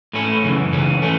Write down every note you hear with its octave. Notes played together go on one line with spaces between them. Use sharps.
A2 A3 C#4 E4
F#2 C#3 E3
C#2 C#3 E3 C#4
E3 A3 C#4